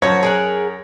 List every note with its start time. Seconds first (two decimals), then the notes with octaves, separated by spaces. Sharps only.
0.02 F#2 F3 F#4 C#5
0.23 G#4 A#4 F#5